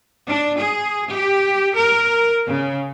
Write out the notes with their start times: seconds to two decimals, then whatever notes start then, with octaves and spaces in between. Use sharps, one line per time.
0.28 D4
0.57 G#4
1.11 G4
1.75 A#4
2.48 C#3